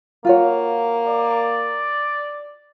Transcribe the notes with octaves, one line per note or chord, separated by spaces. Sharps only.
A#3 F4 F#4 C#5
D5